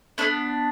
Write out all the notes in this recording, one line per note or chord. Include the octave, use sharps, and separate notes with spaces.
B3 D4 A4